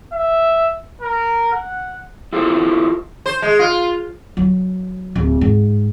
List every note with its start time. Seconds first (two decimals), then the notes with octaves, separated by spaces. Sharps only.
0.13 E5
1.01 A#4
1.53 F#5
2.33 E4 F4 G4 A4 C5
3.26 C5
3.42 G#3
3.59 F4
4.37 F#3
5.15 D1
5.41 G#2